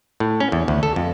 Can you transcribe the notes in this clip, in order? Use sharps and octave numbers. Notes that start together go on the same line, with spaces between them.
A2
C#4
E2
D2
A4
F2